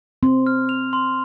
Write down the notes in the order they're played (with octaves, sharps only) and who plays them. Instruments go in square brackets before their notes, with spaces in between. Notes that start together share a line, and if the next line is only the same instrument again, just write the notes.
[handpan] C4 [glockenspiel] C6
[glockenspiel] F6
F7
C6